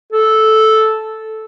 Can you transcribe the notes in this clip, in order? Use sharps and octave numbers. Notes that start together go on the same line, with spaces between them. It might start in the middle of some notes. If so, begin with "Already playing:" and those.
A4